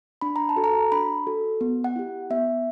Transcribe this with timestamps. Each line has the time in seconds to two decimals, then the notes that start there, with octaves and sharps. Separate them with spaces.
0.21 D4 B5
0.36 A#5
0.49 A5
0.56 F#4 A4
0.64 A#5
0.92 D4 B5
1.27 F#4 A4
1.61 B3
1.84 F#5
1.96 E4 G4
2.30 B3 E5